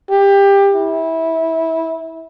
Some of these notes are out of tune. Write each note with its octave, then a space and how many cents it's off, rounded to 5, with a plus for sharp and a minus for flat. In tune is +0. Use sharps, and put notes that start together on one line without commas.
G4 +20
E4 -20